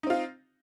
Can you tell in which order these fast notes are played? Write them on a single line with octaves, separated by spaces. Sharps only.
D#4 C4 F4